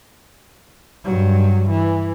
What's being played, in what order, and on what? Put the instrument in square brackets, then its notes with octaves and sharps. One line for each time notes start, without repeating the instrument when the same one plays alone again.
[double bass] G2 F#3
E3